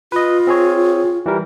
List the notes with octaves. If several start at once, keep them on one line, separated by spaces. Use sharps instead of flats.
F4 B4 D#5
C4 G#4 C#5
E3 G3 A#4